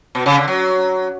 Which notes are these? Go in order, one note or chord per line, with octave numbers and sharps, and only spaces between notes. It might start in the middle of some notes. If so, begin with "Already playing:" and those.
B2
C#3
D3
F#3